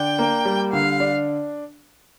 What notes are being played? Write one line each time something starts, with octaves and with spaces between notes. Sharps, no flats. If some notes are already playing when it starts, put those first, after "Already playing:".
Already playing: D3 D4 G5
A#3
G3
D3 F5
D4